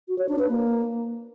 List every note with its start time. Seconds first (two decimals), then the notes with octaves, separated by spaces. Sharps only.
0.08 F#4
0.19 C#5
0.29 D4
0.39 B4
0.49 A#3